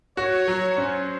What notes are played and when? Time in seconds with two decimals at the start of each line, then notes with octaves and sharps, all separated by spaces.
0.17 F#4 C#5
0.48 F#3
0.78 C#4 C5